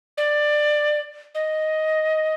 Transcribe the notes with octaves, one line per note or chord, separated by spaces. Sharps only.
D5
D#5